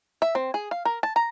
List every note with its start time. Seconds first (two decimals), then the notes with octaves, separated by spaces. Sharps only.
0.22 E5
0.35 C4
0.54 G#4
0.71 F5
0.85 A#4
1.03 A5
1.16 A#5